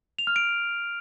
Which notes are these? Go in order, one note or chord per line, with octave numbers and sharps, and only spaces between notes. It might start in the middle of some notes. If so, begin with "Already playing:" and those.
F7
F6
D7